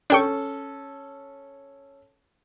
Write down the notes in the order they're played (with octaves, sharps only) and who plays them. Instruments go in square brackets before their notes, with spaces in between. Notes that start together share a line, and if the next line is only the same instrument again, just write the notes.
[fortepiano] C#4 A4 [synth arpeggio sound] D4 G5 C#6